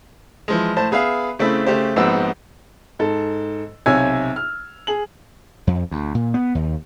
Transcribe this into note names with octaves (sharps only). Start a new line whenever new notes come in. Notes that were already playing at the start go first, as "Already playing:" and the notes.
E3 F3 G#3
A2 C5 A5
B3 G#4 B4 E5 F5
C#3 A3 C4 E4 B5
C#3 A3 G4 C5
A#1 G#2 B3 C4 F#4 E6
G#2 A4
B1 C3 C#5 G#5 E6 G#6
F6
G#4 F#7
F2
D2
A#2
B3
D#2